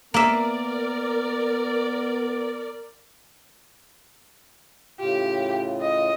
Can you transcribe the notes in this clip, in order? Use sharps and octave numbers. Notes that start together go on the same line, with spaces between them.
A#3 B3 A#4 D5 E5
A2 C#3 F4 G4
D#5